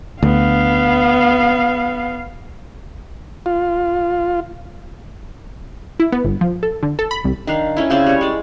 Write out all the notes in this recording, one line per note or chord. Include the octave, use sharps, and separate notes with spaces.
D2 B3 F5
F4
E4
B3
G1
F3
A4
D3
A4
B5
C2
D#3 D4 F5
A3 C#4 E4
C#3 C4 C#4 D5
G3 C#5
G#3 D5